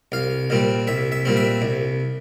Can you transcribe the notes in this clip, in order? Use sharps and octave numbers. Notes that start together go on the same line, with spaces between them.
C2 F5
A#2 G3 C4
C2 E5
E5
A#2 G3 C4
E5
C2